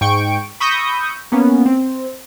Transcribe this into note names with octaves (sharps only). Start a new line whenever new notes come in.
G#2 G5 C#6 D7
B5 C#6 D#6 E6 G6 A#6
A#3 B3 C#4
C4